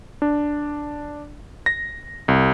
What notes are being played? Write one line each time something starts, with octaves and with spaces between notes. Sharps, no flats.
D4
A#6
C2